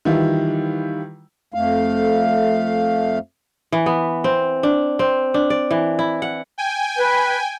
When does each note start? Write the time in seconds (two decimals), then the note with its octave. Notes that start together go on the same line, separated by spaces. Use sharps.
0.05 D#3 E3 G3 E4 F4
1.54 F2 A3 F5
3.72 E3
3.86 B3
4.24 C4
4.63 D4
4.99 C4
5.34 D4
5.50 D5
5.71 E3
5.99 E4
6.22 F#5
6.58 G5 G#5
6.97 B4